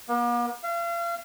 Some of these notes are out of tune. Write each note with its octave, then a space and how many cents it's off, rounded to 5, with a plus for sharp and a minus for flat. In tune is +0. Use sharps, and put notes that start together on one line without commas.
A#3 +45
F5 -35